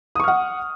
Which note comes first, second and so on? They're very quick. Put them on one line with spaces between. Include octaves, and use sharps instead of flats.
D#6 C#6 F6 F#5